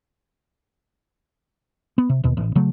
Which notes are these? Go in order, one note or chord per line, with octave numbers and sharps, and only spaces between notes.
B3
C3
D#2 B2
A1
C#3 F#3 A3